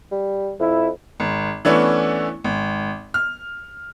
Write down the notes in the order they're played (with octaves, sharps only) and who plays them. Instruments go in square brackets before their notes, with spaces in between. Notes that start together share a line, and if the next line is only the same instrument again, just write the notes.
[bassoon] G3
[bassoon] F2 [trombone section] E4
[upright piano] G#1
E3 A3 B3 C#4 D4 E4
G#1
F6